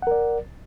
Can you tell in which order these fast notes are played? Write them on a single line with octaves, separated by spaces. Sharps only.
F#5 A#4 D5